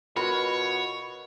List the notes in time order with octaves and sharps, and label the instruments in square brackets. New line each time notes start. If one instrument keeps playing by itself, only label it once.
[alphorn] B2 [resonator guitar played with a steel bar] F4 F#4 A#4 [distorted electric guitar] C#5 [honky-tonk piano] B5